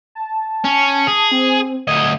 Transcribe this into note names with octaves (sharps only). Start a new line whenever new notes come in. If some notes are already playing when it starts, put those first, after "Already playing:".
A5
C#4
G#4
C4
D2 D#5 G#6